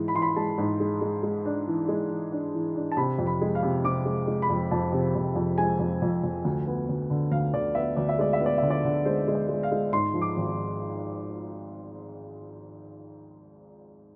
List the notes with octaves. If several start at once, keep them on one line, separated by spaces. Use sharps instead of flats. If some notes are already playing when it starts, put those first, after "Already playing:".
Already playing: G#2 E3 G#3
B5
E3 C6
B5
G#3 A5
G#2
G#3
G#3
G#3
D4
E3
G#3
E3
D4
E3
D4
A5
C3 B5
F2
B5
G#3
F5
C3
C3 D6
G#3
G#3
B5
F2
F2 A5
C3
F2
F2
G#3 G#5
F2
F2
F2
D2
B3
D2
D3
D2 F5
D3 D5
B3 E5
D2 D5
E5
G#3 D5
E5
B3
D5
D3 E5
D5
D3
G#3 C5
G#3
D5
G#3
F5
G#3
G#2 C6
F3
D6
G#1